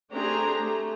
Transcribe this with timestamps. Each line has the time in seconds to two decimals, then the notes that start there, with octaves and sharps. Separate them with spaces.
0.11 A3 C4 D4 G4 G#4 A#5
0.60 A3